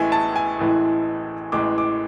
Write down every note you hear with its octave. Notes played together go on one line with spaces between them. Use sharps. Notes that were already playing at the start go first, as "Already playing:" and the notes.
Already playing: A1 A2 E3 G#3 E5 G#5
A5
G#5
A1 A2 E3 G#3
A1 A2 E3 G#3 D6
D6